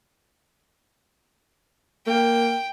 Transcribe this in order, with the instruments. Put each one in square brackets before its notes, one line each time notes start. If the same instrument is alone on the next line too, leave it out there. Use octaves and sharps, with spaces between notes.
[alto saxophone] A#3 [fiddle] G5